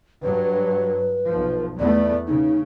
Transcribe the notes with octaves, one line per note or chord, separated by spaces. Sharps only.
G2 F#3 B4
B1 F3
E2 A3 B3 D5
C#3 D#4